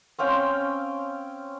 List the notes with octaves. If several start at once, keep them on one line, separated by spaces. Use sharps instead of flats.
C4 C#4 F5 G5